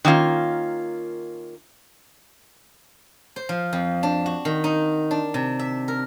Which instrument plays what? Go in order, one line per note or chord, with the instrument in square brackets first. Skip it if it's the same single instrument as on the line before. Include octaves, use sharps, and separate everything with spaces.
[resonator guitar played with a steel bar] D#3 A#3 C#4 F4
[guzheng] C5
F3
F2
D4
F#4
D#3
D#4
D4
C3
E5
A#4